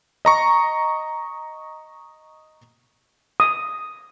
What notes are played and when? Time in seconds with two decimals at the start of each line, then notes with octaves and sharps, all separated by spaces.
0.25 D#5 A#5 C#6
3.40 D#6